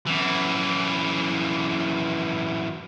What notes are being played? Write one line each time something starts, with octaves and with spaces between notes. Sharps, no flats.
F#2 E3